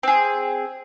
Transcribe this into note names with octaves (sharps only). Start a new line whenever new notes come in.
C4 G#4